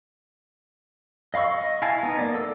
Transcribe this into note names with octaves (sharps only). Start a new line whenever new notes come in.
D#5 F5 B5 C#6 E6
D#5
E4 F5 G#5 A5
B3 D#4
A#3 D5
A4 E6